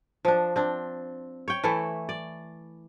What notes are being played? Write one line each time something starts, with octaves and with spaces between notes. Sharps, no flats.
F3 D4
C4 D4
C#5 G5
E3 A3 E4 A4
D5